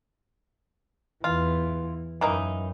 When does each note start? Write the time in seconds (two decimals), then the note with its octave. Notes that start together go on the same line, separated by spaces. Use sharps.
1.24 E2 E3 F4
2.21 F#2 E3 A#3 D#4